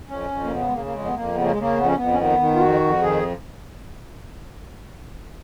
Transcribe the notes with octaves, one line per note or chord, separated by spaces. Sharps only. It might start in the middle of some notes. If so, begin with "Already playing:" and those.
F2 C#4
F2
A#3
C#3 B3
G#3
C#3 A#3
A#3
F2 G#3
B3
F2 A#3
C#3 B3
A#3
G#3
C#3 A#3
F2 B3
C#4
F2 B3
C#4
D#3 B3
D#3
F4
F2 F#4
F2
D#3 G#4